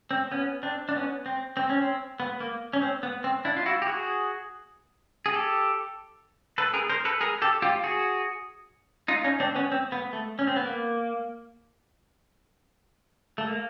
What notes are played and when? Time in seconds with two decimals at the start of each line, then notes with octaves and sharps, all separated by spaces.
0.11 C4
0.32 B3 C#4
0.63 C4 D4
0.89 D4
0.95 B3 C#4
1.26 C4
1.57 C4
1.70 C#4
1.82 C4
2.20 B3
2.40 A#3
2.73 C#4
2.82 C4
3.03 B3
3.24 C4
3.45 D4 E4
3.56 F4
3.66 E4 F#4
3.82 G4
3.87 F#4 G#4
5.26 G#4
5.33 G4 A4
6.58 A4 B4
6.74 G#4 A#4
6.90 A#4 C5
7.05 A4 B4
7.21 G#4 A#4
7.42 G4 A4
7.62 F4 G4
7.84 F#4 G#4
9.08 D#4 F4
9.24 C#4 D#4
9.40 C4 D4
9.55 B3 C#4
9.72 C4
9.92 B3
10.13 A3
10.39 C#4
10.47 C4
10.56 B3
10.65 A#3
13.38 A3
13.47 A#3